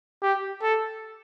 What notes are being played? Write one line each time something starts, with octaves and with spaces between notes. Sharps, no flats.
G4
A4